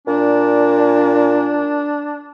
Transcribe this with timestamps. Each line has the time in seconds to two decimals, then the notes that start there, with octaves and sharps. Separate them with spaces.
0.07 A#2 D4